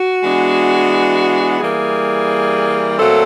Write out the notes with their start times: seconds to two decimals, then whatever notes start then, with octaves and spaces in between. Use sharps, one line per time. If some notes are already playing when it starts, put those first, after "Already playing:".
Already playing: F#4
0.23 E3 G#3 B3 D4
1.60 E3 G3 A#3 G#4
2.98 A#2 F#3 A3 C4 A4